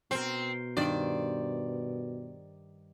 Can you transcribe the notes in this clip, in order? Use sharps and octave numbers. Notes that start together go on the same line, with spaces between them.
B2 C4 A#4 C5
G2 D#3 C5 D5